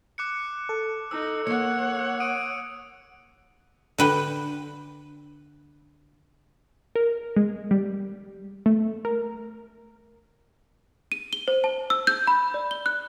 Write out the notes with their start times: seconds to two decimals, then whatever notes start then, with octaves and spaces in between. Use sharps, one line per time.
0.18 D6 F#6 C#7
0.69 A4
1.11 D#4 E6
1.47 A#3 C#5 F#5 C#7
2.20 D#6 D7 D#7
3.98 D3 B4 G5
6.95 A#4
7.36 G#3
7.71 G3
8.66 A3
9.05 A#4
11.12 D#7
11.33 G7
11.48 C5
11.64 A5
11.90 E6
12.07 G6
12.27 B5
12.54 D5
12.71 G7
12.86 F#6